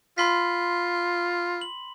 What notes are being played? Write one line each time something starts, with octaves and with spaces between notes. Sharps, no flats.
F4 B5 C6 B6
F#7